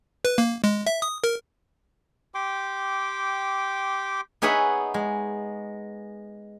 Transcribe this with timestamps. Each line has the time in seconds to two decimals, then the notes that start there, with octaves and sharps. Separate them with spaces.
0.25 B4
0.38 A#3
0.64 G#3
0.87 E5
1.02 D#6
1.24 A#4
2.34 G4 G5 C6 D6
4.42 B3 D#4 G#4 C#5 E5 F#5
4.94 G#3